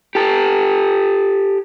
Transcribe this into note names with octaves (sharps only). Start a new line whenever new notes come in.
G4 A4